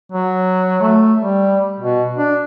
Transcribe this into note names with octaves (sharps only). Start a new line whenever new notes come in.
F#3
A3
G3
B2
D4